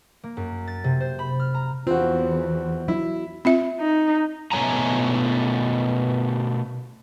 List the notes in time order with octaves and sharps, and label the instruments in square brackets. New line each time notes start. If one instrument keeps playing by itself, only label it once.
[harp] A#3
F#2
A6
C3
C5
B5
F6
A#5
[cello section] E2 [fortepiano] C4 F#4 [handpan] F4
[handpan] F#3 [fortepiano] E4
[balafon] C4 F4 E5
[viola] D#4
[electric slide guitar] B2 A3 C#5 G#5 A#5